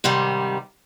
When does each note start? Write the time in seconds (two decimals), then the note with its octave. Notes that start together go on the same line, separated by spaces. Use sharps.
0.04 G#2 C3 D#3 G3